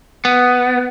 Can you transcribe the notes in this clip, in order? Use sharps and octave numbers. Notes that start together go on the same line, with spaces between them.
B3